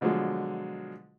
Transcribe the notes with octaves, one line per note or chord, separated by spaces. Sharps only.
B2 D3 F3 F#3 G#3